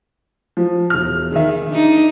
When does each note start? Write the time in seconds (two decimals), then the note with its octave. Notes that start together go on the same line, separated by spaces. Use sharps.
0.57 F3
0.90 E1 F6
1.32 D#3 G#4 E5
1.70 D4 D#4